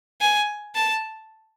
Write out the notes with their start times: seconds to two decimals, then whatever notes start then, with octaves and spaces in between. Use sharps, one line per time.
0.21 G#5
0.75 A5